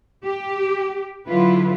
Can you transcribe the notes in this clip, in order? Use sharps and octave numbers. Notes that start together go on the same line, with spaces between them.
G4
D3 F#3 E4 F4 B4